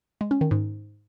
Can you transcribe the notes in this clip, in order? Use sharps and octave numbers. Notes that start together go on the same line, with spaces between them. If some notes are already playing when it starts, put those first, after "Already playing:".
G#3
C#4
D#3
G#2